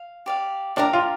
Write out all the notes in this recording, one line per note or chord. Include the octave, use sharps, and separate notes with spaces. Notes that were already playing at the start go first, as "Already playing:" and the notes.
Already playing: F5
G4 D5 F5
D4 G4 A#4 F5 A#5
F4